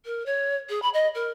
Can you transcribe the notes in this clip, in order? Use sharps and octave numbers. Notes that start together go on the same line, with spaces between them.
A#4
C#5
G#4
B5
D#5
A#4